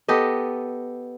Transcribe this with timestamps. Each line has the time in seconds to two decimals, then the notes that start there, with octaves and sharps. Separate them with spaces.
0.08 B3 G4 A4 D#5